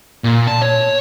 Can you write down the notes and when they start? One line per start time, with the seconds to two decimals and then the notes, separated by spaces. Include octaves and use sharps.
0.24 A#2
0.47 A5
0.62 C#5